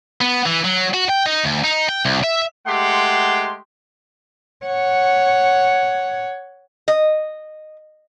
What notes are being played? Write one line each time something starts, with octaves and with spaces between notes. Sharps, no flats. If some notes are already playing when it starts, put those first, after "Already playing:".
B3
E3
F#3
F#4
G5
D#4
D2
D#4
G5
C2
E5
G#3 A3 G4 F#5 C6
C#5 F#5
D#5